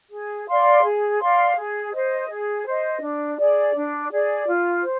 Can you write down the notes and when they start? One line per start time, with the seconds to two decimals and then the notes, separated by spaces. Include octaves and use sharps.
0.11 G#4
0.47 D5 F5 C6
0.83 G#4
1.20 D5 F5 C6
1.57 G#4
1.93 C5 D#5
2.29 G#4
2.66 C5 D#5
3.01 D4
3.38 G#4 D5
3.74 D4
4.11 G#4 D5
4.47 F4
4.83 C5